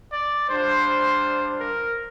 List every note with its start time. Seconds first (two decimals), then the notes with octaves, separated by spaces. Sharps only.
0.13 D5
0.50 G3 D4 F4 C5
1.61 A#4